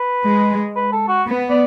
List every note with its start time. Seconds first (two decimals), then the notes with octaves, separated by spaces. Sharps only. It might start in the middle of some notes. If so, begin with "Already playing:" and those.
Already playing: B4
0.26 G#3
0.76 B4
0.92 A4
1.08 F#4
1.26 B3
1.50 D5